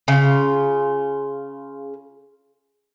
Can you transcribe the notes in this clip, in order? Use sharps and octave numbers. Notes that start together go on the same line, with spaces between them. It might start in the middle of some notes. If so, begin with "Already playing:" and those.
C#3 F4